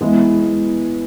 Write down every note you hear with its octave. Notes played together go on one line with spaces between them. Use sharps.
E3 G#3 B3 E4